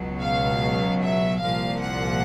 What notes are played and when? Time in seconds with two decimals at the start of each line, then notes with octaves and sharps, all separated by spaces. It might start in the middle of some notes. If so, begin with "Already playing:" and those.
Already playing: C#2 B2 F#3
0.20 F5
1.01 E5
1.40 C2 A#2 F3 F5
1.81 F#5